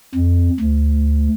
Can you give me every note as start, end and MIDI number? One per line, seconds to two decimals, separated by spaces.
0.15 0.50 41
0.60 1.28 38